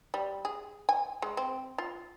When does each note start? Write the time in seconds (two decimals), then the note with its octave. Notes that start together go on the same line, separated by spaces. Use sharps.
0.14 G3
0.45 G#4
0.89 G#5
1.22 G#3
1.37 C4
1.78 F4